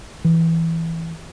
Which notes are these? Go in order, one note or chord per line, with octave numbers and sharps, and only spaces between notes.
E3